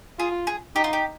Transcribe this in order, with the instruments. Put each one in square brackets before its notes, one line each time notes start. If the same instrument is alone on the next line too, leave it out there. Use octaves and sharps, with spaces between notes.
[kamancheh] F4 [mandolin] G#4
[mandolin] G#4
[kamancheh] D#4 [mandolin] G4
[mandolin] F4
G4